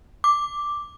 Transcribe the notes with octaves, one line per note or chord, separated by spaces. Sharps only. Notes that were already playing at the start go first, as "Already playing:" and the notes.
D6